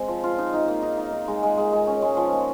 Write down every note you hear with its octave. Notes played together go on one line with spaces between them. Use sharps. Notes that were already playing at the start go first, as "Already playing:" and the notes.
Already playing: G#3 C4
F3
F4
D#4
D#4
A#3
D#4
D#4
A#3
G#3
G#3
G#3
G#3
C#4
G#3
F3
A#3